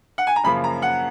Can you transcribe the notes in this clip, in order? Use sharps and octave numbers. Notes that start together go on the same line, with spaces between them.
F#5
G#5
A#5
F#2 C#3 F3 A#3 B5
A#5
F#5